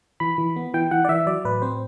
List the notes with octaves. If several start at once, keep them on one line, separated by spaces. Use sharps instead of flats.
E3 B5
E3
B3
E3 G5
E3 F#5
D5
E3 E5
F#3 D5
A2 B4
C4 C5